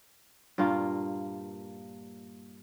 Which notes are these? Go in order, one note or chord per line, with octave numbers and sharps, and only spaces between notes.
G2 A#2 A#3 F4